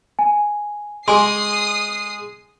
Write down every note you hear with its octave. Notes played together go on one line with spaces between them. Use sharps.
G#5
G#3 G#4 G#5 C6 D#6 C7 D7